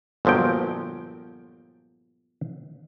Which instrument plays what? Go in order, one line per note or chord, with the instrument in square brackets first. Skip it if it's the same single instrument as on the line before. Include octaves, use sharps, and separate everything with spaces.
[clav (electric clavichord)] G1 A#2 F3 F#3 G5